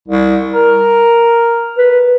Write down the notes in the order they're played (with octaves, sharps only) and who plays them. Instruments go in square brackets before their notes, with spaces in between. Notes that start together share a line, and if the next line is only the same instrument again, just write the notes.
[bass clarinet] C2
A#4
[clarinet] B4